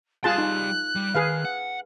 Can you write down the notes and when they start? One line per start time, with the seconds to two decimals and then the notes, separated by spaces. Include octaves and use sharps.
0.24 G3 F4 G#4 A5 C6 F#6
0.38 D#4
0.96 G3
1.15 D#3 G#4 B4 F5
1.45 F#5